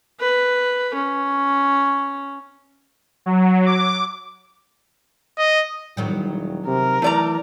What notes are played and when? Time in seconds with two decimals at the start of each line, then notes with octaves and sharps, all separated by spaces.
0.20 B4
0.94 C#4
3.26 F#3
3.66 D6
5.38 D#5
5.97 E1 D#3 F#3 G3
6.67 C3 A#4
7.02 E3 A3 D5 A#5